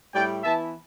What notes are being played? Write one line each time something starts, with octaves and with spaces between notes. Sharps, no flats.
A2 G3 E4 D5 G5
E3 B3 E4 E5 A5